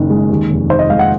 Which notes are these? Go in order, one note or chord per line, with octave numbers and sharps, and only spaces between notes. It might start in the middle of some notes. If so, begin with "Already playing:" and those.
Already playing: F#1 D#3
G#3
D#2
F1
D#3 C5
D#5
G#3 F5
F#5